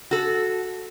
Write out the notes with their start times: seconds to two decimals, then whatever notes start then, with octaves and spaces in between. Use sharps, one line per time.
0.11 F#4 A4